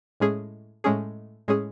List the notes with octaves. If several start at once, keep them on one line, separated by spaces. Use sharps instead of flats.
A2 G#3 C#4 G#4
A2 G#3 C#4 G#4
A2 G#3 C#4 G#4